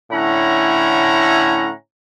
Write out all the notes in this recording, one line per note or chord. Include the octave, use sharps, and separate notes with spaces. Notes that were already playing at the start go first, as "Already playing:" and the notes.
A2 D3 C#4 E4 F#5 A#5